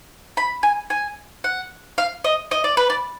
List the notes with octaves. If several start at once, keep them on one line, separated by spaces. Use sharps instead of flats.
B5
G#5
G#5
F#5
F5
D#5
D#5
D5
B4
D5